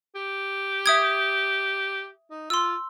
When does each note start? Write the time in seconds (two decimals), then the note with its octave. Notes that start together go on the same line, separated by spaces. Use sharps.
0.15 G4
0.86 E5 D#6 G#6
2.30 D#4
2.50 F4 C6 E6